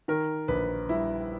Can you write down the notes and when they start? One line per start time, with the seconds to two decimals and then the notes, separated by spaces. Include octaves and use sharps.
0.08 D#3 A#4
0.48 A#1 B4
0.89 G3 E4